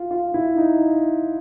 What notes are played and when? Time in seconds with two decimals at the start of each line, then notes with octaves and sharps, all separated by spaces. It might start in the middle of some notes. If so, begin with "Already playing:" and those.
Already playing: F4
0.11 F4
0.34 E4
0.57 D#4